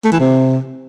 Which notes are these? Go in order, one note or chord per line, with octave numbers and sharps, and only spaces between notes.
A3
E3
C3